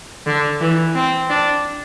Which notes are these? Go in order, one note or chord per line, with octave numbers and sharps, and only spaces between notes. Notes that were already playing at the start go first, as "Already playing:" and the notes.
D3
E3
C4
D4